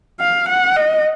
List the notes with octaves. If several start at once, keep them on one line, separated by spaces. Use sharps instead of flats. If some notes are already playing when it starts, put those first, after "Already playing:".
F5
F#5
D#5